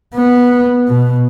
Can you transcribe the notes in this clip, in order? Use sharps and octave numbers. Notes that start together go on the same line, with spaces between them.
B3
B2